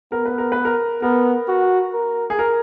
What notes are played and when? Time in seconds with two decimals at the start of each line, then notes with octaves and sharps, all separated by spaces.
0.12 B3 A#4
0.25 B4
0.38 A#4
0.52 B4
0.65 A#4
1.02 B3 A#4
1.48 F#4
1.94 A#4
2.30 G#4
2.39 A#4